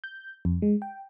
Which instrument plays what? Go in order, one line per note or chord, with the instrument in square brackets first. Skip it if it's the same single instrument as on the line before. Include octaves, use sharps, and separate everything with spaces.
[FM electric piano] G6
F2
G#3
G5